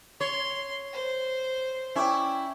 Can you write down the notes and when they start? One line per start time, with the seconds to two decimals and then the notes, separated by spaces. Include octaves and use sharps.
0.21 C#5 C6
0.93 C5
1.96 C#4 E4 D5 G5